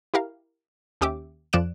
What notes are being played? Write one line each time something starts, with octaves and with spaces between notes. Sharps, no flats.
E4 G4 A#4 F5
D#2 C#4 G4 E5 D6
F2 F3 D5 F#6 D7 E7